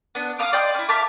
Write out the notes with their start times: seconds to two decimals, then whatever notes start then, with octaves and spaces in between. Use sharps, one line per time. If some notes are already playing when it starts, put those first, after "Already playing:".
0.15 B3 D4
0.39 F5 D6 D#6 F6
0.53 D5 D#5 G5 C6
0.75 C#4 E4
0.89 E5 F5 A5 D6